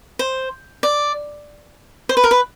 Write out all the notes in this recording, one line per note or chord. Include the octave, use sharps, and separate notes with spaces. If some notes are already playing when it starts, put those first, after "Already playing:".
C5
D5
C5
B4
A#4
B4